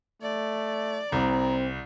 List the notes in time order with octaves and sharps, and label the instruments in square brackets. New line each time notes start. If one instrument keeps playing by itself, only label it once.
[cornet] A3 [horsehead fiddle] D5
[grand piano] C2 [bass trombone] C4 [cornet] A#5